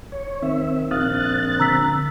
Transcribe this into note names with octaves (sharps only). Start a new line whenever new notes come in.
C#5
D#3 C4 E5
A#1 C4 F5 D#6 F6 F#6 A6
D3 A#5 E6 B6